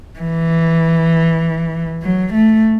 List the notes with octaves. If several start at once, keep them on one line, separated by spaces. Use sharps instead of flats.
E3
F#3
A3